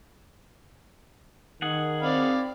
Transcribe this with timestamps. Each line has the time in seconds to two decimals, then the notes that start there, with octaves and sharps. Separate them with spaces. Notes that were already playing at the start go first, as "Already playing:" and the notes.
1.62 D#3 G#4 F#5
2.02 C4 D5 F5 B5